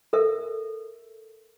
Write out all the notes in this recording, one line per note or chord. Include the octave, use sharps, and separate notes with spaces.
A4 A#4 E5